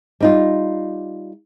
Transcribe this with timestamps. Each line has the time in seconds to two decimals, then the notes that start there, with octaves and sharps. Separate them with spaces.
0.20 G3 D#4 F4